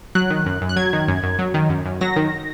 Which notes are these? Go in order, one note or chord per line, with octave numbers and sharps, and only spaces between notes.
F#3 F#6
D#3
F#2
F#2
F#6
F#3 G#6
D#3
F#2
F#2
F#3
D#3
F#2
F#2
F#3 A#6
D#3